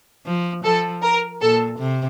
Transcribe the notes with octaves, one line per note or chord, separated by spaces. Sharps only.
F3
F3 A4
A#4
A#2 A4
C3